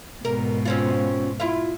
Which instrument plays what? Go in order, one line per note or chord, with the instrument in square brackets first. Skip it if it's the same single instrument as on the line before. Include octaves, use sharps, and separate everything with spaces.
[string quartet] G#2 B2 [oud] A#4
[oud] C4 C#4 F4
E4 F4